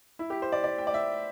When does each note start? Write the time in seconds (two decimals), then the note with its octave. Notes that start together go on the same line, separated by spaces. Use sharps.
0.19 E4
0.30 G4
0.42 C5
0.52 D5
0.64 D5
0.78 G5
0.87 D5
0.94 E5